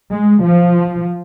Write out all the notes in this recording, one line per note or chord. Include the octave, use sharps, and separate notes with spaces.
G#3
F3